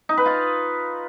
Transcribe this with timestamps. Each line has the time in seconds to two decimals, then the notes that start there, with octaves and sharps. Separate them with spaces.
0.09 D#4
0.17 B4
0.26 F4